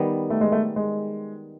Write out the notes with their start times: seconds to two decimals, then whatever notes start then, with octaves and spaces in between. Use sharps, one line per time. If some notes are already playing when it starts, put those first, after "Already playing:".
Already playing: D#3 G3 B3
0.30 A3
0.41 G#3
0.52 A3
0.76 G#3